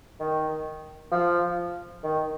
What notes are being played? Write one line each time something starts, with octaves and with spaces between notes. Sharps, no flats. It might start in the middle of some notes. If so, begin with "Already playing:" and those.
D#3
F3
D#3